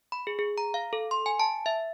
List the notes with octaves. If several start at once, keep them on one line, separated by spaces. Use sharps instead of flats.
B5
G#4
G#4
A#5
F5
A4
C6
G#5
A5
E5